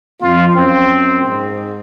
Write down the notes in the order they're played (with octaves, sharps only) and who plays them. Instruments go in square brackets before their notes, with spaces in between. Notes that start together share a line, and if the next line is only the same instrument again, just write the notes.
[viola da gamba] F2 [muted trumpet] F4
[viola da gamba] F#2 [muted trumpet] C4
[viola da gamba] G#2